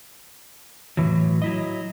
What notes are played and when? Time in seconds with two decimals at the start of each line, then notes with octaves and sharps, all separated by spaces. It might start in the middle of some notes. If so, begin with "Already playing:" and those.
0.97 A2 E3 F#3
1.42 F#3 E4 D#5